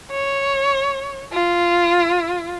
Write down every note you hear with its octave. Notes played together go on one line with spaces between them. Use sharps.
C#5
F4